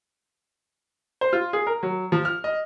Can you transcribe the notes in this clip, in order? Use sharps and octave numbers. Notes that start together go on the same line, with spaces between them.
C5
F4
G#4
A#4
F#3
F3
F6
D#5